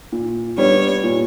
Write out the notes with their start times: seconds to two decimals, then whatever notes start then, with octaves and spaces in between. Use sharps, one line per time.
0.12 A#2
0.58 G3 B3 D4 C#5
1.03 A#2